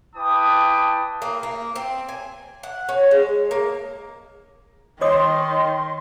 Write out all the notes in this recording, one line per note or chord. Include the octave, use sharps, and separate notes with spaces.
E4 B4 G5 A5 D6 D#6
A#3
A#3
C4
G#5
F#5
C#4
G#3
A#3
D#3 C#5 D#5 C6 D#6